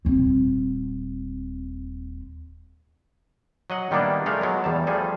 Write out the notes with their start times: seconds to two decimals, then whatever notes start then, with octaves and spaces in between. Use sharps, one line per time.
0.05 D#1 C4
3.70 F#3 D#5 F#5
3.91 D#3 G3 A#3 B3 D4 E4
4.26 G#3 A3 A4 A#4 D5 F5
4.41 F#3 G#3 B3
4.64 E2 G3 A5
4.87 F3 G3 A3 G#4 A4